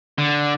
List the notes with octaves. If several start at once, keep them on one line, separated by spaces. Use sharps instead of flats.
D3